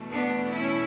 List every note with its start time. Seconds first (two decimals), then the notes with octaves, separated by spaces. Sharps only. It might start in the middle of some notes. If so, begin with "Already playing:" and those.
Already playing: E2 B2 A3
0.12 B3 D4
0.53 C#4 E4